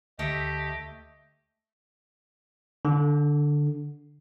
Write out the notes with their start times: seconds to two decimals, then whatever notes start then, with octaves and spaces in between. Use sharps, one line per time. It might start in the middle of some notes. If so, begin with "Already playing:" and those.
0.19 D2 A3 G4 D#5
2.85 D3